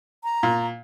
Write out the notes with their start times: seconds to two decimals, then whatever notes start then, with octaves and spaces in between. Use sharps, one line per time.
0.24 A#5
0.43 A#2